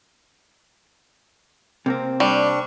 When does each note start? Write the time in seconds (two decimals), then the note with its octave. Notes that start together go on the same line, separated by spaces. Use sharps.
1.86 C3 A#3 C4
2.20 G3 D4 C#6